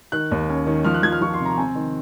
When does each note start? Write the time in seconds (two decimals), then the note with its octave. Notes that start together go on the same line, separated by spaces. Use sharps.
0.12 D#3 F#6
0.31 D#2
0.49 C#4
0.66 D#3
0.85 F3 F6
0.94 F#6
1.03 F3 G#6
1.12 F6
1.21 F3 C#6
1.34 C6
1.40 C3
1.45 A#5
1.57 C4 G#5
1.75 D#3